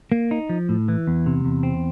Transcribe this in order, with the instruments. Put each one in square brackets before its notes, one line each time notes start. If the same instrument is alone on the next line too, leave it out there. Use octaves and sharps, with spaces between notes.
[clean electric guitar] A#3
D#4
F3
A2
E3
E2
C3
E2
C4